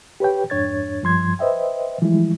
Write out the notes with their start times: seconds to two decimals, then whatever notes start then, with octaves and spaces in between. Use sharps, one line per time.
0.20 G4 B4 C#5 G5
0.50 F2 G#2 D4 C#5 G#6 A6
1.03 G2 F3 C6 G#6
1.39 B4 C5 D#5 E5 G5
2.02 E3 F3 G3 G#3 E4